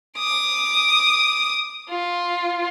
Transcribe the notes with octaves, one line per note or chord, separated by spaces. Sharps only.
D6 D#6
F4